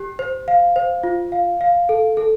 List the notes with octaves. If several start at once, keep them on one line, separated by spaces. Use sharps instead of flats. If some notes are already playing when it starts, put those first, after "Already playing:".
Already playing: G4
C5
F5
C5
F4
F5
F5
A4
A4